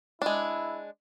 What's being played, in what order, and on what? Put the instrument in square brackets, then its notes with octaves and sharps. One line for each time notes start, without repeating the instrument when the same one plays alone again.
[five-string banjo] G#3 D4 [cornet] E4